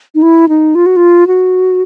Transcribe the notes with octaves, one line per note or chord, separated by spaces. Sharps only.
D#4
E4
D#4
F4
F#4
F4
F#4